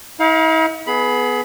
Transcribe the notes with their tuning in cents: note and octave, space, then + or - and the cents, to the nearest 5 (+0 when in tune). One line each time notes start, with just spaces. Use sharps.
E4 -45 F5 +15 A#5 +45
B3 +0 G#4 +25 B5 +0